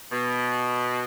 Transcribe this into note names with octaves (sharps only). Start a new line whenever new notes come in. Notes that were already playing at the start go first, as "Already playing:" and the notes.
B2